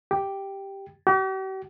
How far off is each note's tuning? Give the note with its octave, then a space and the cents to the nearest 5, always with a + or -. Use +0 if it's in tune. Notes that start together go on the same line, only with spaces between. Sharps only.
G4 +0
G4 -45